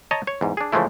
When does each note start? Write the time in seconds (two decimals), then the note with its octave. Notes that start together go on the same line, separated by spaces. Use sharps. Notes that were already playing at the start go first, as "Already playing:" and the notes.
0.11 C#5 D#5 A5 A#5
0.27 C#5
0.41 E2 G#2
0.57 D4 G#4
0.72 C#3 E3 F3 G#3 A3 E4